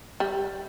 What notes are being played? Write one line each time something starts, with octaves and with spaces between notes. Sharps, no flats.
G3